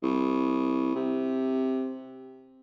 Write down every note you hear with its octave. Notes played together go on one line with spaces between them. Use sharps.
C2
C3